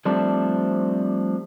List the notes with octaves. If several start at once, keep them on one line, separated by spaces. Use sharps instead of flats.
F3 G3 A3 C4 D4